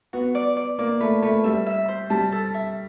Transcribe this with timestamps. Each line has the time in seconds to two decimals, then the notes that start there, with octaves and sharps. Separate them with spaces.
0.13 B3 F#4
0.35 D5
0.57 D5
0.79 A#3 D5
1.00 A3 B4
1.22 A3 B4
1.44 G3 E5
1.66 E5
1.88 C5
2.10 G3 A5
2.32 A4
2.54 E5